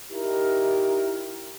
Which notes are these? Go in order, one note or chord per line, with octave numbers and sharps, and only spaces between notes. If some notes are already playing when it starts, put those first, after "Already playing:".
D#4 E4 G4 A#4